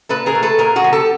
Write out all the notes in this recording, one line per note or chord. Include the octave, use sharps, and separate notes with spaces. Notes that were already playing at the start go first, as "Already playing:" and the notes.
A#2 A4 B4
G#4 A#4
A3
A4 B4
A#2 G#4 A#4
F#4 G#4
F3
G4 A4